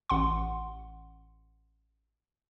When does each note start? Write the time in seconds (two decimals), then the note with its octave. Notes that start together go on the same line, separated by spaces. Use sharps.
0.09 A1 F#5 C6